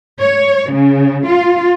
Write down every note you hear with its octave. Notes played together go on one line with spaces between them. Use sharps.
C#5
C#3
F4